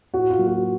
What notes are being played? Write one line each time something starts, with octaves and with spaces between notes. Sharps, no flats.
A2 F#4
F4
F#3 A#3
F#4